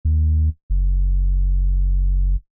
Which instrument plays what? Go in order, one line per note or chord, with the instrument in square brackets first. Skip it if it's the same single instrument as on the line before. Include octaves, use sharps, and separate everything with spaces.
[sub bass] D#2
F#1